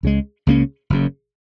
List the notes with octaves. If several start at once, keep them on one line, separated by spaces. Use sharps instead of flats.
C#2 C#3 G#3
C#2 C#3 A#3 C#4
F#1 F#2 C#3